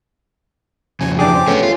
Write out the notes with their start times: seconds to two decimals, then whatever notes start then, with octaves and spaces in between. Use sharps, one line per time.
1.00 F2 C#3 G#5
1.19 E3 D4 G4 G#4 D6
1.35 C5
1.48 A3 B3 C#4 G#4
1.63 F4